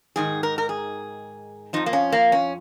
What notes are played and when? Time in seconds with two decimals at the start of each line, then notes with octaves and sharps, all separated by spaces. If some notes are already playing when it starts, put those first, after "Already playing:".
0.16 G#2 D#3 G#4
0.43 A#4
0.58 A#4
0.69 G#4
1.73 F2 F3 D#4
1.86 A#3
1.93 C#4
2.12 A#3
2.32 C#4